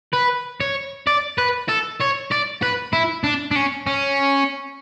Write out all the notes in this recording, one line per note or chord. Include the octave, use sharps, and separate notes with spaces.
B4
C#5
D5
B4
A4
C#5
D5
B4
E4
D4
D4
C#4
C#4